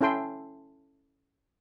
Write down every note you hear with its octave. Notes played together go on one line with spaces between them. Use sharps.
C#4 E4 A4 G5 C6